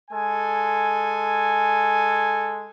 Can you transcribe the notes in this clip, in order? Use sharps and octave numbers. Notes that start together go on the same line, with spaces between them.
G#3 A4 G#5